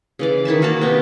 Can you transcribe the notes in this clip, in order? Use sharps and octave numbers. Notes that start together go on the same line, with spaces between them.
C#3 E3 D5
D#3 E4 E5 A5
A#3 F#4 A#4 A5
C3 B3